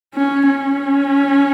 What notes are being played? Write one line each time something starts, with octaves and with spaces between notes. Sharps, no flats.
C#4
C#4